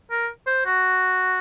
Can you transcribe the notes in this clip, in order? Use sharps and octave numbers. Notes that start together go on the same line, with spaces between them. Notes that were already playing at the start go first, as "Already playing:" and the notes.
A#4
C5
F#4